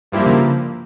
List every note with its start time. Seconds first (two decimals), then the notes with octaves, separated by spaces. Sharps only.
0.12 G2 F3 A#3 E4 G4
0.26 C#3